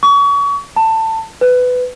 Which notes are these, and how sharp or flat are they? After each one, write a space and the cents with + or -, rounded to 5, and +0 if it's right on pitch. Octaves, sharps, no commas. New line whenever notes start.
C#6 +35
A5 +20
B4 +15